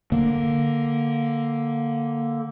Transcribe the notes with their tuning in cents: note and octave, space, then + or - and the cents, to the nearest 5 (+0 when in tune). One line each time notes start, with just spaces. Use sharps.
D3 +0 A#3 +0